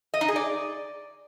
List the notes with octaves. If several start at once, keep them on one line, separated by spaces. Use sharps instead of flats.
D#5
D#4
G#4
D5